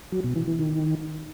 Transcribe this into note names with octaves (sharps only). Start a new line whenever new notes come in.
F#3
B2
E3
E3
D#3